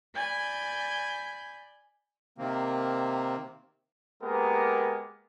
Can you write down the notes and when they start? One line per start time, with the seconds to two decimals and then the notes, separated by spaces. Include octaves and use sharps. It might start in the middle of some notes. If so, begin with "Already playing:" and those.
0.16 D5 G#5 B5 G6
2.38 C3 D#3 A#3 C4
4.23 G#3 A#3 B3 G4 A#4